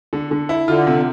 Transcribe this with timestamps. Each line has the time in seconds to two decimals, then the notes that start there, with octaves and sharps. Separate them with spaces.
0.13 D3
0.31 D3
0.49 E4
0.68 D3 F4
0.87 C3